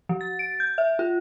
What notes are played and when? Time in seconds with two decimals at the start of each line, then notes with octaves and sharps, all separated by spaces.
0.09 F3
0.21 A6
0.39 D7
0.60 G6
0.78 E5
0.99 F4